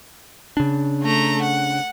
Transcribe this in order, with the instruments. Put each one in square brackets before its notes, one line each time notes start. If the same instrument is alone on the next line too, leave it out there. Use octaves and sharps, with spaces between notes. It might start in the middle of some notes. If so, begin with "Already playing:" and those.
[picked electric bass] C#3 D4
[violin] A3 A#5
F#5